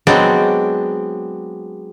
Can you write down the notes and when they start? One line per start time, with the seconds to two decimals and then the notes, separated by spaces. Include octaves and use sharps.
0.07 F#3 G#3 B3 C4 D4